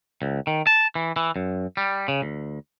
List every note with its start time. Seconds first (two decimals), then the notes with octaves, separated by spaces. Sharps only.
0.22 C#2
0.47 D#3
0.67 A5
0.95 E3
1.16 E3
1.36 F#2
1.77 G3
2.08 C#3
2.22 D2